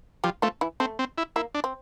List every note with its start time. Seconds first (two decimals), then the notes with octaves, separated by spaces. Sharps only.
0.24 F3 G3 G4
0.42 F3 A3 F4
0.61 E3 E4
0.80 A3 C4
0.99 C4
1.18 E4
1.36 A#3 E4
1.55 D4
1.64 C4